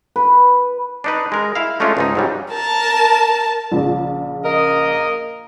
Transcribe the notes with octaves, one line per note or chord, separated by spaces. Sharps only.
B4
D4 D#4 B4
G#3 A#4
E4 F5
G#3 A3 C#4 D4 F4
C#2 G#2 D#4
G#2 F#3 G3
A#4 A5
A#1 C#3 D5
A#3 A#4 D#5